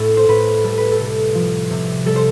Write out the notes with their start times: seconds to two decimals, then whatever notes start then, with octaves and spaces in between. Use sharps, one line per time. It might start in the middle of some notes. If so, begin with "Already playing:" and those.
Already playing: A2 A4
0.17 C5
0.28 A2 B4
0.64 G3 A4
0.78 B4
0.92 A4
0.99 C3
1.35 F3
1.70 C3
2.06 G3 A4
2.16 C5